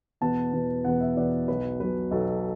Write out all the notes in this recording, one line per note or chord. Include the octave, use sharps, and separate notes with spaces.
E2 B2 B3 A5
E2 B2 B3
E2 B2 B3 F#5
E5
E2 B2 B3 D5
B1 B2 F#3 B4
B1 B2 F#3 B4
B1 B2 F#3 A4